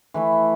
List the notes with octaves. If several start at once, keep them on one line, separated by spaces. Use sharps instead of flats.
E3 A3 E4